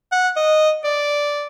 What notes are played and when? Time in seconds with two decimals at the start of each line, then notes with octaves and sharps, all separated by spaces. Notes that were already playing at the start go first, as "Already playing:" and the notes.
0.12 F#5
0.36 D#5
0.84 D5